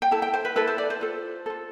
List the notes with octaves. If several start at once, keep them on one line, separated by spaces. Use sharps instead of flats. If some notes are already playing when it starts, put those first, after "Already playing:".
G5
E4 A4 A5
G5
C5
B4
E4 A4 B4
C5
D5
C5
F4 A4
F4 A4